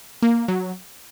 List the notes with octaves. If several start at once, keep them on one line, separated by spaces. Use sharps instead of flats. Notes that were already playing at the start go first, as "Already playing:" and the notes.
A#3
F#3